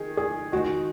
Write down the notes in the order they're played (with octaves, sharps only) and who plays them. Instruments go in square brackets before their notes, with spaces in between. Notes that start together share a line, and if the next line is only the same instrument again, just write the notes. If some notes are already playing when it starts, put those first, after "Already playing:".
Already playing: [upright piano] D#3 [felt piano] G#4
[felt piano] G#4
[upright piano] D#3 G#3 D#4 [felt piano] F#4